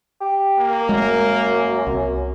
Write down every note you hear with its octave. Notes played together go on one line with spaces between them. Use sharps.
G4
A#3
F#2 G#3 A3
C2